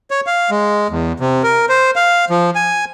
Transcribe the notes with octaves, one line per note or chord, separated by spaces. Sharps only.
C#5
F5
G#3
E2
C3
A#4
C5
F5
F3
G#5